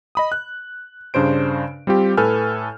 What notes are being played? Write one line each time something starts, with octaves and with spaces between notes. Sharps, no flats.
D#5 B5 D#6
F#6
G2 C#3 D4 C5 D7
G3 C4 F4 G4
A2 A4 B4 G#5 F6 G6